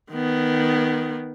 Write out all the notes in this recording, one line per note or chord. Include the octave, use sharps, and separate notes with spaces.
D#3 B3